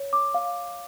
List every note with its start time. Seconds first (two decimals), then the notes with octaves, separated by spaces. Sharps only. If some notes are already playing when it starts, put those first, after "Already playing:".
Already playing: C#5
0.13 D6
0.34 F5